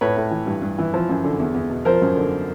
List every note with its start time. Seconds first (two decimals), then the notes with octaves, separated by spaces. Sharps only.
0.01 A2 B4 C#5
0.17 A2
0.31 E3
0.47 G2
0.62 G2
0.78 E3
0.94 F3
1.09 F#2
1.24 D3
1.40 E2
1.54 E2
1.70 B2
1.85 F3 A#4 C5
2.02 F#2
2.16 D3